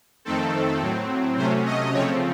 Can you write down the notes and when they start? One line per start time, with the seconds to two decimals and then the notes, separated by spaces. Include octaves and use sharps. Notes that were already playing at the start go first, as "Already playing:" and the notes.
0.25 F2 D#3 A3 C4 A4
0.81 A2 F#3 C4
1.37 C3 F#3 A3 C#4 C5
1.66 D#5
1.93 C#3 F3 A3 C4 C#5